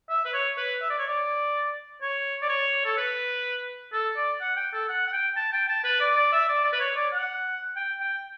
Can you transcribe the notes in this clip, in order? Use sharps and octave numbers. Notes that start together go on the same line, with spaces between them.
E5
B4
C#5
B4
E5
D5
C#5
D5
C#5
D5
C#5
A4
B4
A4
D5
F#5
G5
A4
F#5
F#5
G5
A5
G5
A5
B4
D5
D5
E5
D5
D5
B4
C#5
D5
F#5
G5
G5